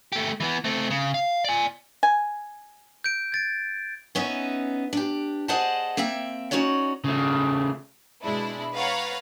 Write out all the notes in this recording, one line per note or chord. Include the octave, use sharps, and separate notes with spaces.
A3 G4
E3 B3
A3 C4
C#3
F5
D5 G#5
G#5
G6 D7
G#6 A6 D7
B3 C#4 D#4 E5
D4 G4
G#4 C5 D5 D#5 F#5 A5
A#3 C4 E5 G5
C#4 D#4 F#4 C#5 D5
C#3 A3
B2 G#3 D4 E4
B4 C#5 F5 F#5 A#5 A6